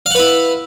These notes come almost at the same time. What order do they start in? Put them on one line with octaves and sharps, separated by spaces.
F5 F#5 B4 E4